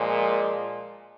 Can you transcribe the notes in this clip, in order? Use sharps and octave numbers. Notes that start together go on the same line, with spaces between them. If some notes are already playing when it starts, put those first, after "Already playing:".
Already playing: A#2 F3 G#3